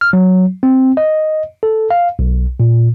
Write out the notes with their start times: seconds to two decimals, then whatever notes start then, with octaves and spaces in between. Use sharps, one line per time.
0.01 F6
0.13 F#3
0.63 C4
0.97 D#5
1.63 A4
1.91 F5
2.19 B1
2.60 A#2